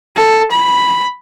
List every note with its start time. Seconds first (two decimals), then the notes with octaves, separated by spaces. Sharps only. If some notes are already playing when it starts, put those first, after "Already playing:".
0.16 A4
0.51 B5